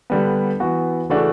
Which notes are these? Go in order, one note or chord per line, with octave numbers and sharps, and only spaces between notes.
D3 G3 B3
E3 B3 F#4
C#3 E3 A3 D4 F#4